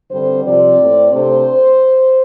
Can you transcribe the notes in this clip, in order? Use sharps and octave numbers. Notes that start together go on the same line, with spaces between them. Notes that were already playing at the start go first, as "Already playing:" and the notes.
G2 D3 G3 C4 C5
C3 F3 C4 D5
A2 A3 C4
C3 A3 D4 C5